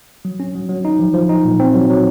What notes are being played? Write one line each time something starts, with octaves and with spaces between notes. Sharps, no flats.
F#3
C#4
F#3
F#3
D#4
F3
F3
D#4
A#2
C4
F#3
F#3